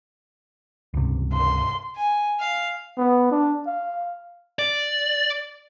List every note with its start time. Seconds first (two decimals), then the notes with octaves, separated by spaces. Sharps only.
0.94 C#2 G2 C3
1.34 C6
1.96 G#5
2.40 F5
2.97 B3
3.31 D4
3.66 F5
4.59 D5